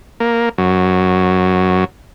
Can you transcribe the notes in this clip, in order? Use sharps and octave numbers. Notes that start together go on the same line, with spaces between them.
A#3
F#2